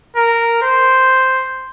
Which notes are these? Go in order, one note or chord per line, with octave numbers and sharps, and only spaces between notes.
A#4
C5